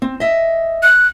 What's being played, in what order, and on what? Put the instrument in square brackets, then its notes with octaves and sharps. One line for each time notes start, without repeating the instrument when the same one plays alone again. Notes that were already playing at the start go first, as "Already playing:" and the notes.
[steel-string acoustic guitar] C4
D#5 E5
[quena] F#6